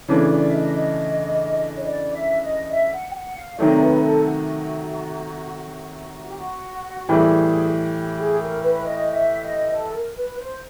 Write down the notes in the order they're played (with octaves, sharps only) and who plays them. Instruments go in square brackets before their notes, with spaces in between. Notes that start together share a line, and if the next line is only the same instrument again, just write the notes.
[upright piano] C#3 E3 A3 D4 [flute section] C#5
[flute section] D5
E5
D#5
D#5
C#5
D5
E5
D#5
E5
F#5
G5
F#5
F5
[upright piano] C3 D#3 F#3 A3 [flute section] D5
[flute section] B4
A4
F#4
F#4
G4
F#4
[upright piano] A2 E3 G3 [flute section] G#4
[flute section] G4
G#4
A#4
B4
D#5
E5
D#5
A4
A#4
B4
C5